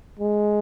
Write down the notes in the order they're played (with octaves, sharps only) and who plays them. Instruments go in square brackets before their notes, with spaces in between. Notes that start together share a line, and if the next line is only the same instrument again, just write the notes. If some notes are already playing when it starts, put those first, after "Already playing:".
[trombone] G#3